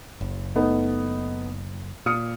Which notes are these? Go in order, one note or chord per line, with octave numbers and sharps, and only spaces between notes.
F#1
A3 B3 D#4
A#2 D#6 F6 C#7